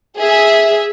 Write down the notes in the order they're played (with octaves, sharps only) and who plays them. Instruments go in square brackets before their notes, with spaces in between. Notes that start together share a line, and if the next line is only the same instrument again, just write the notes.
[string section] G#4 E5